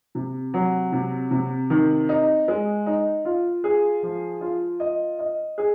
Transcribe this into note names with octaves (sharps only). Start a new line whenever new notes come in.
C3
F#3
C3
C3
D#3
D#4
G#3
D#4
F4
G#4
F3
F4
D#5
D#5
G#4